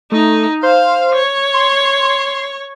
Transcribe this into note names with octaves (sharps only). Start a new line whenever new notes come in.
A3 D#4
C5 F5
C#5
C6